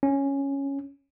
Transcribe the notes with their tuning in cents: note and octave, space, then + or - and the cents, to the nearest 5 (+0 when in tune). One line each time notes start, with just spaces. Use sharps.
C#4 +0